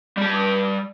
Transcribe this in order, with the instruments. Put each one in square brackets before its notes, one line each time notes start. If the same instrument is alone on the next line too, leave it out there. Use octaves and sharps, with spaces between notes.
[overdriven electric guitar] G3 A5